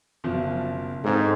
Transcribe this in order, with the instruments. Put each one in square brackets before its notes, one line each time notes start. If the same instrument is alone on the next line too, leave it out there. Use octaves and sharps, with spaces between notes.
[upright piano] F#1 B2 F3
[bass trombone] G#2 [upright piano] D3 C4